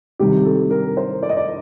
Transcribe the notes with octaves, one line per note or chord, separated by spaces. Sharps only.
C3 D#3 G3 G4
A4
A#4
C5
D5
D#5
D5